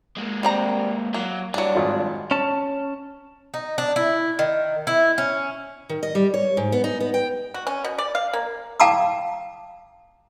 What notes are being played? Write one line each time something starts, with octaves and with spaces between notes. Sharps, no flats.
G#3 A#3
G3 C4 A#5
F#3 A#3
G2 F#3 D4
G#1 F4
C#4 A5
D#4
D4
E4
D#3
E4
C#4
D#3
D#5
G3
C#5
G#2
B3
D#4
B3
G5
F#4
C#4
B2
D5
F5
A#3
F5 G5 A5 A#5 D6 D#6